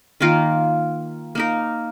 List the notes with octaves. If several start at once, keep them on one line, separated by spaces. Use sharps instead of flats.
D#3 A#3 F4 A#4
A#3 D#4 A#4